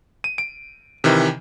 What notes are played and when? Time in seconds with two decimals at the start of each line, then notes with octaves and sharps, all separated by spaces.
0.24 D#7
0.38 D7
1.04 C3 D#3 E3